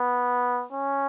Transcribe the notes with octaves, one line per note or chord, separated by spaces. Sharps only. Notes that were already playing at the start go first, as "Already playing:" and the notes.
Already playing: B3
C#4